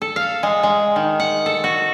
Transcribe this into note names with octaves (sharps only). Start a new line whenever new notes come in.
A4
F5
G#3
G#3
D#3
F#5
A4
F#4